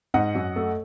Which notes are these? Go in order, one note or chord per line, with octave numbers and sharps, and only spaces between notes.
G#2 D#5 F#5
F#2
A3